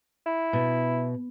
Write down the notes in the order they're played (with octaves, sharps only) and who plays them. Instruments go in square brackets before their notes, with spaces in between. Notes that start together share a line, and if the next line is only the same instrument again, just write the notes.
[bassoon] E4
[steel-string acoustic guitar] B2